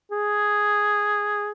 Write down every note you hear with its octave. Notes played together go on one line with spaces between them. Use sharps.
G#4